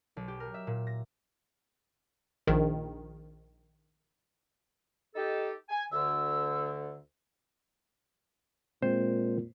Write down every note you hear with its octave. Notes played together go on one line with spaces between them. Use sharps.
B1
G4
A#4
E5
A#2
A#6
A#1 D#3
D#4 G4 A4
G#5
D2 D3 E6
A#2 G#3 C4 C5